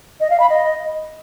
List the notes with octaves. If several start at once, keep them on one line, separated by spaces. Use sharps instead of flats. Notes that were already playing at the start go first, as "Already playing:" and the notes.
D#5
F5
B5
D#5